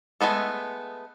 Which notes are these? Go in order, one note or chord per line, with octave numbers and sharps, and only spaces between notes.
G#3 A3 B3 A4